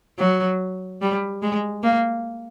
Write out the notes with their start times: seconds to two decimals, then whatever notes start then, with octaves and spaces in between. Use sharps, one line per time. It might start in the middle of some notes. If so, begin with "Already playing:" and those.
0.19 F#3
1.02 G3
1.42 G#3
1.83 A#3